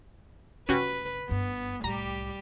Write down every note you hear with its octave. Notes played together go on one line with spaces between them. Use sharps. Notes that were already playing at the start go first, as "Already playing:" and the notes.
G1 C#3 C#4 F#4 G4 B4
G1 G2 B3
C2 A2 G3 G4 A#5